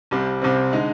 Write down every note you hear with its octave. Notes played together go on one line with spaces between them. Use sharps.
C2 C3 G3 C4
C2 C3 G3 C4
D3 G#3 D#4